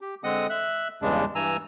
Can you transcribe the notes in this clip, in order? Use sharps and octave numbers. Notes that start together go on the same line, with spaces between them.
G4
D3 G#3 C4 D#5 F#5 D#6
E5 F#6
E2 G2 C#3 G#3 D4
G2 E3 G#5 A#5 E6